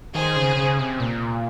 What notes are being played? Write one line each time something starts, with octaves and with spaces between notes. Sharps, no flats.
D#3 G#4 C5
C#3
C#3
C3
A#2